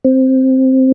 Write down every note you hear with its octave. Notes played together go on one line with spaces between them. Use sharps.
C4